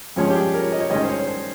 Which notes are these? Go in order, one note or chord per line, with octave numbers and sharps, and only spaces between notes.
G2 F3 G#3 C#4 C#5
G4
G#4
A#4
C#5
D#5
C#5
G2 D#3 G#3 C#4 D#5
C5
C#5
C5